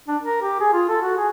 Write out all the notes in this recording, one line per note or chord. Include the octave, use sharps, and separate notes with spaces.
D4
A#4
G4
G#4
F4
A4
F#4
G#4